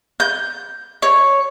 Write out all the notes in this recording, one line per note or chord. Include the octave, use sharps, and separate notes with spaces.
G6
C#5